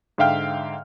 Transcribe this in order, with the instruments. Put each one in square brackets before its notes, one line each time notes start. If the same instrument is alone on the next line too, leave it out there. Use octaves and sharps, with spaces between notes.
[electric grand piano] G#2 D3 E5 F5 G5 F6